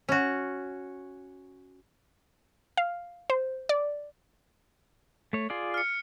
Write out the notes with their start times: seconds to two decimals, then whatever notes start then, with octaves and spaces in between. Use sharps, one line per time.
0.09 C#4 F#4
2.77 F5
3.30 C5
3.69 D5
5.33 A3 C#5
5.50 F4 G#4 D5
5.74 F6 C#7